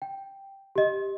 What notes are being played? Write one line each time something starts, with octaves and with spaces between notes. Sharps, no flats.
G5
G4 D#5